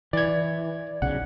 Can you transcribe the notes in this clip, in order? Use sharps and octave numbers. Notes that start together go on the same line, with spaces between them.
E3 D5 G#6
B1 C#3 F#5